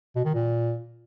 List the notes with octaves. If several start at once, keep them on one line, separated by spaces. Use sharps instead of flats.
B2
D#3
A#2